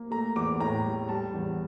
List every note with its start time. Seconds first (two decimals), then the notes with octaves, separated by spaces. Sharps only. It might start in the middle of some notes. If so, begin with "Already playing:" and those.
Already playing: A#3
0.11 A3 A#5
0.36 E2 D6
0.60 A2 A#5
0.84 G3
1.09 G3 A5
1.34 E2